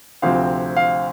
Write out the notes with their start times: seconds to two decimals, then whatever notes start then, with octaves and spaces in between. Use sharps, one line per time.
0.22 D2 C3 F3 C4 F5
0.77 F5